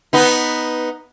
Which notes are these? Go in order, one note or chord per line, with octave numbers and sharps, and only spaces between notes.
B3 D#4